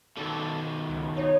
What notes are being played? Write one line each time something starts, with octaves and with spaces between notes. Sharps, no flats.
B2 D#3 A4 D5
C#2
D#4 C#5